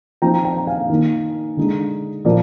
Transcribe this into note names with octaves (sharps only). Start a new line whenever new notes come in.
F3 C4 D#4 G5 A#5
G5 A#5
F5 G#5
D#3 A#3 D#4
D3 G#3 D#4
A#2 F3 A#3 A#4 D5